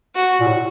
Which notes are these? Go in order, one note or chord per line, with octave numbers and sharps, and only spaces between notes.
F#4
A#2
A2